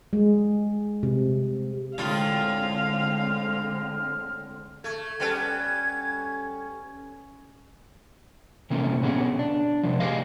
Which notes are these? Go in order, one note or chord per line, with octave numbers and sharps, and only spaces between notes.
G#3
C3
A2 D3 G#3 C4 F4 F5 F6
A3 G#6
G3 B3 C#4 A4
C3 E3 A3 A#3 C#4
B2 B3 C#4 G#4
D4
C3 F3
A3 G4 G#4 D#5 F5